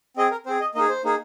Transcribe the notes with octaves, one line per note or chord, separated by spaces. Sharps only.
C4 G#4 D#5
A#4
C4 G#4 C5
D#5
A#3 D#4 G#4 D#5
C5
A#3 D#4 G#4